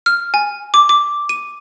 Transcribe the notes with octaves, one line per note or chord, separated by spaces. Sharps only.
F6
G#5
D6
D6
D#7